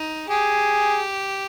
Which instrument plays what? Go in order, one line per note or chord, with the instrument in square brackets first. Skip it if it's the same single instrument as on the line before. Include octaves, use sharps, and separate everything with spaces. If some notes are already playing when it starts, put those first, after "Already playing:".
Already playing: [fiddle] D#4
[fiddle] G4 [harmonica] G#4